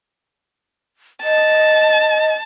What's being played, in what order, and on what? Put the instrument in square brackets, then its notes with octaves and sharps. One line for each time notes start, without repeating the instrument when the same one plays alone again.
[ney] D#5 [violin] A5